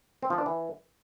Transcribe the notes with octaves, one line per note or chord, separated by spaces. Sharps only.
C4
F3
D4
E3